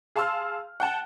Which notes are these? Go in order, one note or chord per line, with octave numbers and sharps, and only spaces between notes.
G#4 F5 A5 C6 E6 F6
F#5 G5 A5